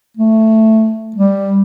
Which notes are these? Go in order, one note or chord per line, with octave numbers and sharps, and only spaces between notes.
A3
G3